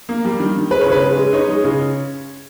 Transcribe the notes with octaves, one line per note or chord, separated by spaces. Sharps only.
A#3
G3
D#3
D#3
G#3 B4
C#5
C#3
B4
G#3
G#3
D#4 C#5
G#3
C#3